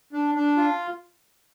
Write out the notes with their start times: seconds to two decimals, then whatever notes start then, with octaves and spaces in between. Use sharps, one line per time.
0.13 D4
0.35 D4
0.57 F4